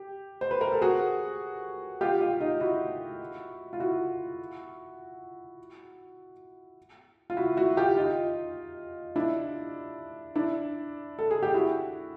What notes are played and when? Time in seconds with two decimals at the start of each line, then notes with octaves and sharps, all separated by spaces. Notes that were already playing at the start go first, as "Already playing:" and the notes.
Already playing: G4
0.41 C5
0.51 B4
0.61 A#4
0.72 A4
0.82 F#4 G#4
2.01 F4 G4
2.21 F4 G4
2.40 D#4 F4
2.60 E4 F#4
3.73 F4
3.79 E4 F#4
7.30 F4
7.37 E4 F#4
7.57 E4 F#4
7.77 F4 G4
7.97 D#4 F4
9.16 D4 E4
10.35 D4 E4
11.19 A4
11.31 G#4
11.43 G4
11.54 E4 F#4